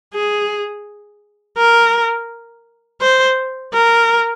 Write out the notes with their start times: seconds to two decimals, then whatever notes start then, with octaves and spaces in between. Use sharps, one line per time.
0.14 G#4
1.58 A#4
3.01 C5
3.73 A#4